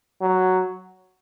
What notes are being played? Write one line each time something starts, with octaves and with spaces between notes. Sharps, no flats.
F#3